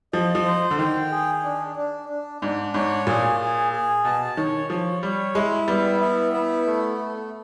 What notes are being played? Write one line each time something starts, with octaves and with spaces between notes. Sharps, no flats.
F3 D#5
F3
C5
D3
D#3 G5
G#4
D4
D4
D4
G#2 D4
G#2 C#5
A#2 G#4
G#4
G#4
B2 A5
D#3 C#5
F3 C#5
G3 C#5
G#3 E4
G3 B3
E4
B3
A3
A3